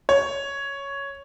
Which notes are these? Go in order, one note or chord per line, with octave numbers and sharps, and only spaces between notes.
C#5